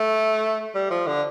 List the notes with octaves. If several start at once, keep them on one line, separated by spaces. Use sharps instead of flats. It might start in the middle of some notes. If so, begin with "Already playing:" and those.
Already playing: A3
G3
F3
D3